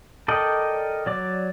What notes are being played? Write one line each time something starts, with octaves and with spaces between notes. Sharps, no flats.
A4 A#4 D5 D#5 G5
F#3 D5 D6